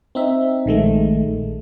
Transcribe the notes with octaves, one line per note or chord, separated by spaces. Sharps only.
C4 D#4 E5
A#1 D#3 G#3 A3